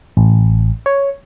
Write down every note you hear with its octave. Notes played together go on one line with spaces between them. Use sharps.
A1
C#5